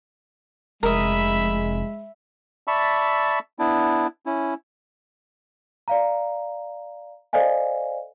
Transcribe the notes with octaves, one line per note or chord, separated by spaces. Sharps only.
F1 G#3 A#4 E5 B5 D#6
D5 E5 A5 B5 C#6 E6
B3 D4 E4
C#4 E4
D5 F5 A#5
A4 C5 D5 D#5 F5 G#5